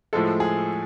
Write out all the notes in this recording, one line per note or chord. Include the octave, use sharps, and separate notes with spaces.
A2 F3 G#3 A4
G#4